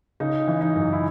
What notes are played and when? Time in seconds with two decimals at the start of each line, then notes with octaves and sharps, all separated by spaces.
0.20 C#3 D#4
0.48 E3
0.61 D#4
0.76 F#2
0.93 E4